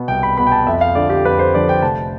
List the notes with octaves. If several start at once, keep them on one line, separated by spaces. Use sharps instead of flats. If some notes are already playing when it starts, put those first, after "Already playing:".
Already playing: B2 B3
C2 G5
B5
B2 B3 B5
G5
A5
F2 E5
F5
D3 F3 D5
G4
F2 B4
C5
D3 F3 D5
G5
F1 A5